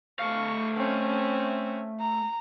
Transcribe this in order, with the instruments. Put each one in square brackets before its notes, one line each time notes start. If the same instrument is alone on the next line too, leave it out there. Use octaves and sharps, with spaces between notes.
[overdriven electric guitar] A3 F5 [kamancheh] C#6
[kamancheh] C4 C#4
A#5